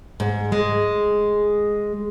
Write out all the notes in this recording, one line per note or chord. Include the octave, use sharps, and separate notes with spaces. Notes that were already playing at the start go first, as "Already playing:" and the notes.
G#2
G#3